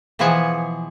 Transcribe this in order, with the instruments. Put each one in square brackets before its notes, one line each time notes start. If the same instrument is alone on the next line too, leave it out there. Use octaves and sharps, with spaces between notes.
[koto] B2 E3 F3 G#4 F#5 G#5